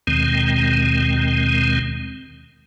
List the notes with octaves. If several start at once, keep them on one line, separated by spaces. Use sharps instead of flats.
D#2 B2 D#3 G#3 C4